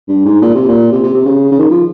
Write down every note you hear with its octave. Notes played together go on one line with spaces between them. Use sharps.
G2
G#2
A#2
C3
A#2
C3
C3
C3
C#3
C#3
D#3
F3